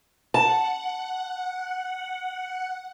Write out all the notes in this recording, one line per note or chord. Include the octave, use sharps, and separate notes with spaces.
F#5 A5